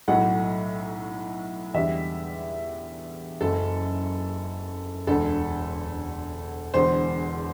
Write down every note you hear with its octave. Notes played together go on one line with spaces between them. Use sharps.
B1 A2 F#3 A3 F#5
E2 D3 G3 E5
F#1 F#2 F#3 A4
E1 D2 D3 A4
E1 E2 D3 C5